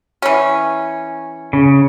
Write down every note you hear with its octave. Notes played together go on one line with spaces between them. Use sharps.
E3 C#4
C#3